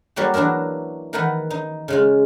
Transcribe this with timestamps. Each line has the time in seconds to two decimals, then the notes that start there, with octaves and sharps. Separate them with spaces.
0.16 F#3 G3 A#3 F#4 G4
0.34 E3 F#3 D4 E4 A#4
1.13 D#3 E3 D#4 A#4 B4 F#5
1.50 D#4
1.88 C#3 G#3 F4